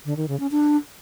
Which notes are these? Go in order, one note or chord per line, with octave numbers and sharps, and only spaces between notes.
D3
D#3
C#3
C#4
D4